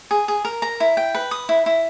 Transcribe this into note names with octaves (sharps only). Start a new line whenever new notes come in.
G#4
G#4
A#4
A#5
E4
G5
B4
D#6
E4
E4